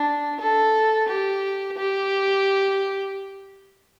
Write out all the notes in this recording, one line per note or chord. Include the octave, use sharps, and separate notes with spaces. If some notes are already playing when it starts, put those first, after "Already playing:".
Already playing: D4
A4
G4
G4